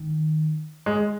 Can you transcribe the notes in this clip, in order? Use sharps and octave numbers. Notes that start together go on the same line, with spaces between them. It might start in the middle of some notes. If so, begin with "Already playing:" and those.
Already playing: D#3
G#3